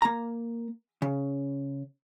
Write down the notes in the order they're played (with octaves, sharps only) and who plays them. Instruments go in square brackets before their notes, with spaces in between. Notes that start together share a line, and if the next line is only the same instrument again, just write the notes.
[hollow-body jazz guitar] A#3 A#5
C#3